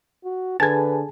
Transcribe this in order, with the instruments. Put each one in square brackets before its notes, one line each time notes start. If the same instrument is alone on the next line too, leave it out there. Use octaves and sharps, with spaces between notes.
[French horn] F#4
[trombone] D3 [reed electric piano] G#4 G#5 A5 [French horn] B4 [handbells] G#6 A6